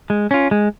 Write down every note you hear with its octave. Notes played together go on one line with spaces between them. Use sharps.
G#3
C#4 F4
G#3